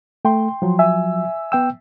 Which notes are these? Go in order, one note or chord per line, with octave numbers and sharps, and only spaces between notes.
A3 G5 C6
F3 F#3
E5 G#5 E6
B3 G5 E6